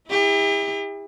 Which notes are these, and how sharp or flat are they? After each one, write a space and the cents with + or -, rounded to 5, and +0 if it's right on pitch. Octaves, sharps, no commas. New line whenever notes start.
E4 -25 G4 +45